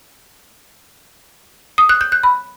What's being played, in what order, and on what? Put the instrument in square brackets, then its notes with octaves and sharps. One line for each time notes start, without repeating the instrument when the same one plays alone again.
[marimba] D#6
F#6
G6
F#6
B5